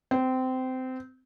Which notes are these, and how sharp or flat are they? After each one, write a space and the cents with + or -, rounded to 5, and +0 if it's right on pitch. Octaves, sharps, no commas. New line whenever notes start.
C4 -20